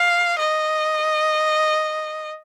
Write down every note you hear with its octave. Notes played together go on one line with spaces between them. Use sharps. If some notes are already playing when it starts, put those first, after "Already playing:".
Already playing: F5
D#5